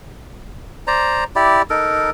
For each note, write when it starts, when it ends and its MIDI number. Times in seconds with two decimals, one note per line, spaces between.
0.87 1.24 72
0.87 1.24 74
0.87 1.24 82
1.36 1.62 64
1.36 1.62 67
1.36 1.62 74
1.70 2.10 63
1.70 2.10 69
1.70 2.10 70